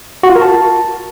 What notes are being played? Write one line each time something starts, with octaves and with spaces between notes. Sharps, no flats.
F#4
F4
A#4
A5